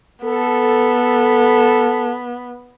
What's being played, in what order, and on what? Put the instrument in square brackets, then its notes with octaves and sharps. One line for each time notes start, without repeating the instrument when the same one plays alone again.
[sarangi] B3 [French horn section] A4